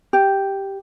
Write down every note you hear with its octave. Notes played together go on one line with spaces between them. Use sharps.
G4